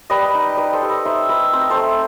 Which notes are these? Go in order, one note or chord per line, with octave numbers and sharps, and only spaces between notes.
G3 B4 D#5
D#4
D#4 B4 D#5
A4 C5
G3
B4 D#5
D#4 C5 E5
A3 B4 D#5
C4 C5
D#5
A4 C5
A3